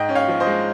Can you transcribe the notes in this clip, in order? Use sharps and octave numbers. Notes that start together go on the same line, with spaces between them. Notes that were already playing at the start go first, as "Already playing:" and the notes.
Already playing: G#2 D#5 G5
C#4
C#5 F5
F3
C5 D#5
G#3